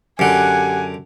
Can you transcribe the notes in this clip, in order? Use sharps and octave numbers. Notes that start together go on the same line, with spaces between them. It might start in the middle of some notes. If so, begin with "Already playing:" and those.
F#2 D3 G4 F#5 G#5 F#6